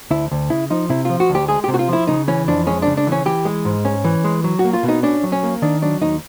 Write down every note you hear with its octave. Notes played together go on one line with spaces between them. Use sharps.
D2 E4
D2
C#3 E4
F3 D#4
C3 E4
F3 F4
F#4
D2
G4
G#3 G#4
C3 G4
F#4
F4
F3 E4
C#3 D#4
E3 C#4
F2 D4
G#3 C#4
C#3 D4
D4
E3 C#4
E3 G4
G#3
G#2
C#4
E3
G#3
F#3
F#4
A#3
F4
B2
D#4
C#4 D4
F#3
C#4
A#3
D#3 D4
F#3 D4
D#2 D#4